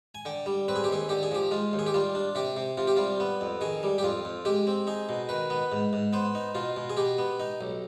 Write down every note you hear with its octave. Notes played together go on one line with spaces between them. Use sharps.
G#5
D3 G5
G3
C4 B4
G#4
G4
D#2 G#4
D3 G4
G#4
F3 G4
G#3 F4
D#2
G#4
G4
G3 F4
D4
C3 G4
C3
C3 F4
G4
G3 F4
B3
F2
D#3 G#4
G3
G4
F2 F4
F2
G#3 G4
C4
D#4 G#4
B2
D#3 B4
B3
G#2
G#2
B3 C5
D#4
B2 F4
B2
G#4
B2 G4
B3
D#4
B1